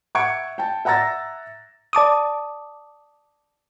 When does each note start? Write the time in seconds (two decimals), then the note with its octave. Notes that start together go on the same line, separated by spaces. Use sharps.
0.15 E5 F#5 C#6 G#6 C#7 D7
0.58 G5 A5
0.85 E5 F#5 A#5 E6 A6 A#6
1.93 D5 A5 D6 D#6